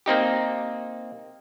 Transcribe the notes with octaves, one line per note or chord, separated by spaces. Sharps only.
A#3 C4 D#4 G4